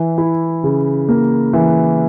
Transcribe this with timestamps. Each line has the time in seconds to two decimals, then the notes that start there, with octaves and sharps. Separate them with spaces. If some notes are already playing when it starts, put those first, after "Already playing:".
Already playing: E3
0.18 E4
0.64 C#3
1.09 A#3
1.53 E3